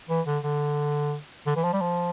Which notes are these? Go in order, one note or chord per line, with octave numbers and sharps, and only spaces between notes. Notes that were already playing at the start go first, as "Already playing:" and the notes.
E3
D3
D3
D3
E3
F3
G3
F3